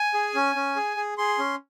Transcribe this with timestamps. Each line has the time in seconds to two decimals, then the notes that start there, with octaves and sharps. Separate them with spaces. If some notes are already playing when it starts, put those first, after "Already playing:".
Already playing: G#5
0.14 G#4
0.35 C#4
0.55 C#4
0.76 G#4
0.97 G#4
1.18 G#4 C6
1.39 C#4